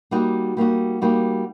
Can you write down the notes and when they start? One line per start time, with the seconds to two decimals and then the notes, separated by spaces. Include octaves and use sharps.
0.11 G3 A#3 D#4 F#4
0.57 G3 A#3 D#4 F#4
1.01 G3 A#3 D#4 F#4